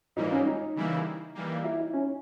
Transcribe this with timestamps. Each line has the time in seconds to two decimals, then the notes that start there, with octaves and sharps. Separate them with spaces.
0.16 G#2 E3 G3 A#3 D#4
0.31 C#4
0.47 D#4
0.76 C#3 E3 G3 A#3 E4
1.35 E3 G3 A#3
1.64 E4
1.79 D#4
1.93 C#4